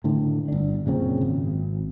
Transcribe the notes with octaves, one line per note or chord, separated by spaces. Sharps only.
A2 D3
G1 D4
F#2 A#2 C#3 C4
G#1